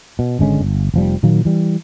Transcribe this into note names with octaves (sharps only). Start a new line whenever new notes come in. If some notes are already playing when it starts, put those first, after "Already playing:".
B2
G#1 D3 G#3 C#4
G1
F1 F3 G3
A#2 D#3 F#3 A#3
E3 G3